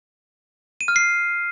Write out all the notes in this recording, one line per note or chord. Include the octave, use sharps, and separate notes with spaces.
D#7
F6
C7